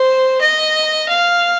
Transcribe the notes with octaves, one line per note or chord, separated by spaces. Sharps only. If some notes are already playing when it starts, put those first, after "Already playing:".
Already playing: C5
D#5
F5